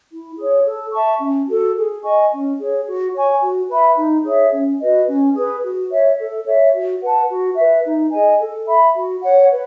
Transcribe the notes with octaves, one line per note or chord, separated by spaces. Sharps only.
E4
G#4 C#5
A4
E5 A5 C#6
C#4
F#4 A4
G#4
D#5 G#5 C#6
C#4
G#4 C#5
F#4
C#5 G#5 C#6
F#4
B4 E5 B5
D#4
G#4 C#5 E5
C#4
F#4 B4 D#5
C#4
G#4 B4
F#4
C#5 E5
A4
C#5 E5
F#4
B4 F#5 A5
F#4
B4 E5
D#4
G#4 D#5 G#5
A4
E5 B5
F#4
C#5 F#5
B4